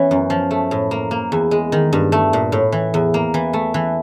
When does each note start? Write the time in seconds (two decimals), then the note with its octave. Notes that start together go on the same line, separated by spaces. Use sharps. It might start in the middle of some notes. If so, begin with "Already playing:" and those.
Already playing: E3 B3 C#4
0.11 F#2
0.30 F3
0.51 A3
0.71 A2
0.91 A#3
1.11 A#3
1.32 E2
1.51 G#3
1.72 D#3
1.93 G2
2.12 A3
2.33 A#2
2.52 A2
2.72 E3
2.94 E2
3.14 A#3
3.34 E3
3.53 A3
3.74 E3